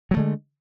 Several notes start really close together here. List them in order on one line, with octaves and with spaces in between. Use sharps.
F#3 A3 D3 G#3